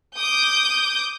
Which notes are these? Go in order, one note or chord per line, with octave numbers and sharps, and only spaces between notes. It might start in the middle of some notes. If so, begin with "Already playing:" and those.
D6 D#6 G6